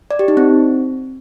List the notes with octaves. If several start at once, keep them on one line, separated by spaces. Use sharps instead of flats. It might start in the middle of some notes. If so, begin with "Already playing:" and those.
D5
G4
D#4
C4